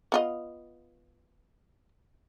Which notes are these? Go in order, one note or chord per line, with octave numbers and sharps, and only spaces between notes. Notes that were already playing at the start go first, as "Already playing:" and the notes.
B3 F4 D#5